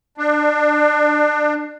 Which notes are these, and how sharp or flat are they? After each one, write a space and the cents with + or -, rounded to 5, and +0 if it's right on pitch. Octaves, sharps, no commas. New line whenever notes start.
D4 +25